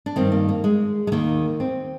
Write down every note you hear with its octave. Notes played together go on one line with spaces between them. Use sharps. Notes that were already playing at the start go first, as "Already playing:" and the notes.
D4
G2 D#3 C4
A#3
A#3
G#3
G#3
D#2 D#3 A#3
C4